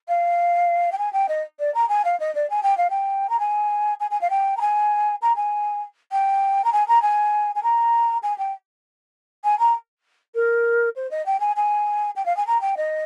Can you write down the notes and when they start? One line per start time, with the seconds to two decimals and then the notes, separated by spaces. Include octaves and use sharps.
0.08 F5
0.92 G5
0.98 G#5
1.13 G5
1.29 D#5
1.59 D5
1.75 A#5
1.89 G#5
2.05 F5
2.20 D#5
2.35 D5
2.50 G#5
2.63 G5
2.77 F5
2.90 G5
3.30 A#5
3.40 G#5
4.00 G#5
4.11 G#5
4.21 F5
4.30 G5
4.57 A#5
4.61 G#5
5.22 A#5
5.36 G#5
6.12 G5
6.65 A#5
6.73 G#5
6.88 A#5
7.02 G#5
7.55 G#5
7.63 A#5
8.23 G#5
8.38 G5
9.44 G#5
9.59 A#5
10.35 A#4
10.96 C5
11.11 D#5
11.26 G5
11.40 G#5
11.56 G#5
12.16 G5
12.26 F5
12.37 G#5
12.47 A#5
12.61 G5
12.77 D#5